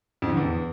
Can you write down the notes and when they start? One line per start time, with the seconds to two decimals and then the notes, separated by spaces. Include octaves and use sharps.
0.22 F2
0.29 D3
0.37 E2